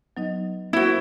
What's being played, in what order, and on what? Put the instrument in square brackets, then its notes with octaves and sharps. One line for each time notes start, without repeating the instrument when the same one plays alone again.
[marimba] F#3 D#4 D#5 [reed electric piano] B3
[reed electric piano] A#3 G#6 [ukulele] E4 F#4 [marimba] C5 B5